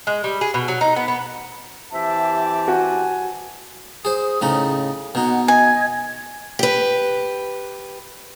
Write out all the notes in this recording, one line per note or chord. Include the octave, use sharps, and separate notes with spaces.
G#3
G3
G#4
B2
F#3
D#4
B3
B3
E3 C4 G4 E5 A5
F#4 G#5
G#4 C5 D#6
A2 C#3 D#4
B2 D#4 F#5
D#5 G#5 G#6
G4 B4